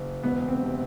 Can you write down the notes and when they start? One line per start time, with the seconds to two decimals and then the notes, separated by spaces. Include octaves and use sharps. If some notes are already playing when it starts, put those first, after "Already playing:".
Already playing: F#1
0.23 E1 B3
0.48 C4
0.62 C3